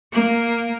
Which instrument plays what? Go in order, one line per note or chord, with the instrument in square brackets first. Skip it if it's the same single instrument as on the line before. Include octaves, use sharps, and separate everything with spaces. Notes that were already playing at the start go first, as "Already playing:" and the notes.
[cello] A#3